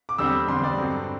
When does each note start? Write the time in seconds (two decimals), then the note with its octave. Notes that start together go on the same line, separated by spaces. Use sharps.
0.09 D6
0.18 E2 D3 G3 C4 E6
0.48 E2 D3 G3 C4 C6
0.64 D5
0.78 G2 D3 F#3 C4